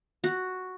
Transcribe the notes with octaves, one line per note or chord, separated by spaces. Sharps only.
F#4